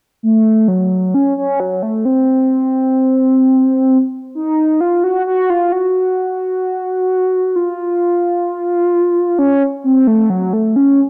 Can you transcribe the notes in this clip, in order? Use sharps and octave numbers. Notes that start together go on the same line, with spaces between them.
A3
F#3
C#4
C#4
F#3
A3
C4
D#4
F4
F#4
F#4
F4
F#4
F4
C#4
C4
A3
F#3
A3
C#4